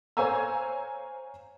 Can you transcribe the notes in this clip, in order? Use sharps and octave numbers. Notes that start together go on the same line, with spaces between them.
C5 C#5 F5 G#5 A#5 E6